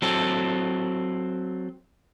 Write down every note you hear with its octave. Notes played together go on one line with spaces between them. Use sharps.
F#3 C4 A4